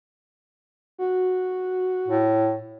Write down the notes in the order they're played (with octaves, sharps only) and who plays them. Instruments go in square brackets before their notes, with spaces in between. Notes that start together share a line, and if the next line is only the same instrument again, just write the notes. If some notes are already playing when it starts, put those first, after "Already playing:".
[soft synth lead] F#4
[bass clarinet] A2